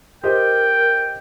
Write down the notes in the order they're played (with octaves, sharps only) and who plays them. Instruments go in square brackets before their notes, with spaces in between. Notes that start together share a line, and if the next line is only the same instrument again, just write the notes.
[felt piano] G4 C5 D#5 [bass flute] A#4 [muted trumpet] G5